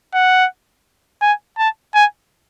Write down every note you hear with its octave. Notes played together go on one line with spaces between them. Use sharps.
F#5
G#5
A5
G#5